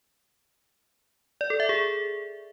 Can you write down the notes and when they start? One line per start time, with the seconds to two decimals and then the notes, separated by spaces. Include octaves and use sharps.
1.41 D5
1.50 A4
1.60 E5
1.69 G#4